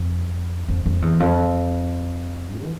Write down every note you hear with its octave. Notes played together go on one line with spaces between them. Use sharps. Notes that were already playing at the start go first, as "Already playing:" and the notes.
Already playing: F2
F2
F2
E2
F2
E3